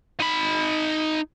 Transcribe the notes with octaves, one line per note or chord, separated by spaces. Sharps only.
D#4 B5